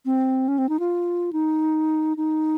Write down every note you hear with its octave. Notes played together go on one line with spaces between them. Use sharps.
C4
C#4
C4
D#4
F4
D#4
D#4